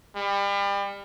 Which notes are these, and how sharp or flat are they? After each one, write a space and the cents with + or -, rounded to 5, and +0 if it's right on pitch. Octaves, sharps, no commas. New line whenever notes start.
G3 +35